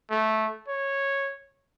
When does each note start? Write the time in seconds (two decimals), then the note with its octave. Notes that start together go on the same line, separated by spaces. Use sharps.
0.10 A3
0.68 C#5